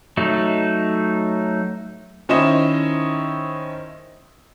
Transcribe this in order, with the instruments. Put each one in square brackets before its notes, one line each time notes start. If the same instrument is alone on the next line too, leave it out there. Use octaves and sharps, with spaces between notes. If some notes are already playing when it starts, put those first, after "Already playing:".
[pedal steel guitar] F#3 A3 D#4
[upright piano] D#3 C#4 E4 C5 D#5 E7